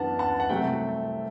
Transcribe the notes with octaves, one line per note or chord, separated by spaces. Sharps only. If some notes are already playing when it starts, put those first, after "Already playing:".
Already playing: F#2 E3 B3 D4 F#5 A5
F#5 A5
F#5
C2 C3 F#3 A3 C4 E5 G5